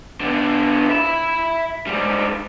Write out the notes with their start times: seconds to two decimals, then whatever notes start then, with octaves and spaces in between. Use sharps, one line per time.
0.20 D3 B3
0.89 E5 B5
1.87 G#2 G3